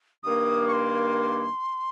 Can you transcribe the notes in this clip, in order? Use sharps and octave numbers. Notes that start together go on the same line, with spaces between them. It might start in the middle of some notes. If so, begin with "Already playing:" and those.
G2 D#3 A#3 D#6
C#6
C6